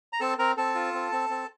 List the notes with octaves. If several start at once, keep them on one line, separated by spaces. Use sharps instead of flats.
A#5
C4 A4 A5
C4 A#4 A#5
C4 A4 A5
F4
C4
C4
C4